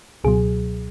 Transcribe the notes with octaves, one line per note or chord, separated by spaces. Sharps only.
C#2 B2 F#3 G#4